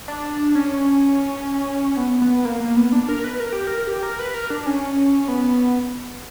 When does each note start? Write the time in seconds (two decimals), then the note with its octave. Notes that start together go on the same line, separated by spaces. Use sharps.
0.08 D4
0.55 C#4
1.97 B3
2.22 B3
2.45 A#3
2.60 A#3
2.77 B3
2.92 D4
3.09 A#4
3.24 B4
3.40 A#4
3.53 G4
3.67 A#4
3.87 G4
4.03 A#4
4.19 B4
4.34 A#4
4.50 D4
4.66 C#4
5.28 B3